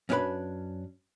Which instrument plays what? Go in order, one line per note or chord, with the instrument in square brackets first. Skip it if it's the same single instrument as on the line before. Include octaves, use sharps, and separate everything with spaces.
[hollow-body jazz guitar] F#2 C#4 D4 G4 B4 B5